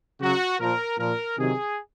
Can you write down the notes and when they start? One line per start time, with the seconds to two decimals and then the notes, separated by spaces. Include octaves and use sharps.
0.20 C#3 F#3 F#4
0.59 A#2 F3 A#4
0.98 A#2 F3 A#4
1.38 C3 D#3 F#3 G#4